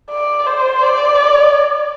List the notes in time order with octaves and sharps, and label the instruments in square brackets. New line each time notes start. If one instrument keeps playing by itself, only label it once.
[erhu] D5
C5
D5